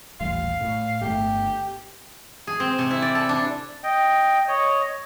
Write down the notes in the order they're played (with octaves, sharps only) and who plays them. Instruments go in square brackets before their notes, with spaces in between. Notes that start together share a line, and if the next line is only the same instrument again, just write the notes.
[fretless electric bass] D#1 A1 G3 [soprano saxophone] F5
[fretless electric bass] A2
[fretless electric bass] G1 F2 A3 [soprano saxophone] G4
[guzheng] G#4
C4
C3
E4
D5
A4
D4
[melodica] D#5 G5
C#5 D#5